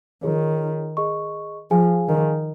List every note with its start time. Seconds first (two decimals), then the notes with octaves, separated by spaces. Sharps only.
0.23 D#3 F4 G#4 C#5
0.97 G#4 D#5 C#6
1.71 F3 G#4 F5 G#5
2.08 D#3